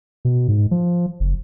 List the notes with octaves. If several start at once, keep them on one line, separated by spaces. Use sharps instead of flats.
B2
G#2
F3
F#1